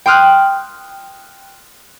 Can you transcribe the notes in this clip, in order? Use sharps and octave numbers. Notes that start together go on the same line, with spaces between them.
G5 C6 D#6 F6 F#6